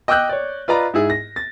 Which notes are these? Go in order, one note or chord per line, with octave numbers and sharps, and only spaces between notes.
D#5 G5 D6 E6 F#6 G6
C#5 D5
F4 B4 D5 D#5 A#5 B5
G#2 E4 G#4
A#6
A6